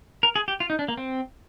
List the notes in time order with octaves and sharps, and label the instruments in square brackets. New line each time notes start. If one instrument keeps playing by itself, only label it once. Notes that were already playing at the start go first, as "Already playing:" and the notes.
[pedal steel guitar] A#4
G#4
G4
F4
D#4
D4
A#3
C4